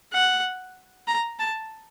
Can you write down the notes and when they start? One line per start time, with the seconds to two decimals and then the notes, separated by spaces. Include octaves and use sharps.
0.13 F#5
1.07 A#5
1.39 A5